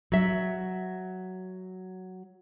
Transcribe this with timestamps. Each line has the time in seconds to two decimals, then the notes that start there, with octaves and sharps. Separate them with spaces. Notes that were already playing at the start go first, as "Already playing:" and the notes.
0.12 F#3 E5